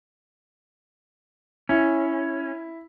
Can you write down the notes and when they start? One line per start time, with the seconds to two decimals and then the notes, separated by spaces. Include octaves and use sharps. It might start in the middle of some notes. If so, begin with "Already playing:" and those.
1.69 C#4 E4